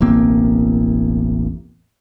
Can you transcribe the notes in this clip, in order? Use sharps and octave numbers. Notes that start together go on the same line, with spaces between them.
E1 A1 A#3 C4